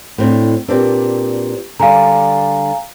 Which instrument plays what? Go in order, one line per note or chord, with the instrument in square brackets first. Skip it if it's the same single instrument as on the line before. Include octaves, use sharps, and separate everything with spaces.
[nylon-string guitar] A2 C4 D4
[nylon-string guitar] A#2 C4 D4 [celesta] G4 B4
[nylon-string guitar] D3 G3 [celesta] F5 G#5 A#5